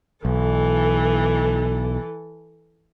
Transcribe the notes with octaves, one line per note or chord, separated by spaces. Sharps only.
B1 E3 A4